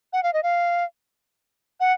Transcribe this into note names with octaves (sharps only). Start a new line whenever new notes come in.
F#5
F5
D#5
F5
F#5